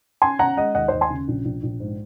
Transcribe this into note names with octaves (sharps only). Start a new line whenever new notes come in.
C#4 G#5 C6
C#4 F#5 A#5
G#3 D#5 F#5
D#2 D#5 F#5
D#2 C5 D#5
G#5 C6
C#3
A#1
A#1
A#1
G#2